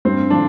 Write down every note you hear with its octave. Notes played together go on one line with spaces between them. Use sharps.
G2 C4
D3 F3 D4